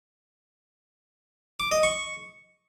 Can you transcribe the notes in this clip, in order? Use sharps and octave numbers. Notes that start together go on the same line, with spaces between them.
D6
D#5
C#6